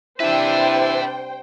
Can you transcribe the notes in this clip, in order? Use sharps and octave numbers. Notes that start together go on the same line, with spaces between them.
C3 G3 D4 E4 B4 C5 E5 G5